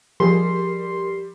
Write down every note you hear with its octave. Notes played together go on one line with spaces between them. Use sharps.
F3 G3 G#4 A#4 C6